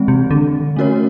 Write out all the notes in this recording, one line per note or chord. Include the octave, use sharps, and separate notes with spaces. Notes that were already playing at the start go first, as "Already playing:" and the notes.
Already playing: E3 G#3 C4
C3
D3
A3 C#4 F#4 A#4 C#5